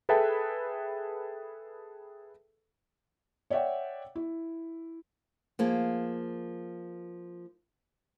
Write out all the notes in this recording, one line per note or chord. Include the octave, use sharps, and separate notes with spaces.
G#4 A4 B4 E5 G5 A5
C#5 D5 E5 F#5 G5
E4
F3 A#3 G#4